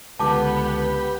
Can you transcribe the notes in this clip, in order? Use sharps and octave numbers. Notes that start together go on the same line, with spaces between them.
C#2 D3 B3 G4 B4 A5 D6